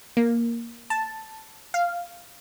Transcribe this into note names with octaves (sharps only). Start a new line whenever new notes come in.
A#3
A5
F5